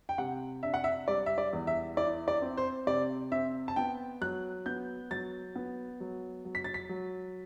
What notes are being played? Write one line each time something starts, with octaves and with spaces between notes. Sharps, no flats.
G5
C3 F#5
D4 E5
F#5
E5
G3 D5
E5
D5
E2
E5
E4 D5
D5
C4
C5
C3 D5
C4 E5
A5
B3 G5
F#3 F#6
B3 G6
F#3 A6
B3
F#3
F#3
B6
A6
B6
F#3